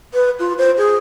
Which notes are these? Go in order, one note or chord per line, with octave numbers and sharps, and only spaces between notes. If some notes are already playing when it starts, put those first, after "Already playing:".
B4
F4
C5
G#4